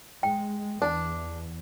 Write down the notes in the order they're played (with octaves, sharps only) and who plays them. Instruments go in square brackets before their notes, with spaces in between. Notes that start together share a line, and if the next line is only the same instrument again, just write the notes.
[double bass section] G#3 [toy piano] G5
[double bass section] E2 [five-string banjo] D4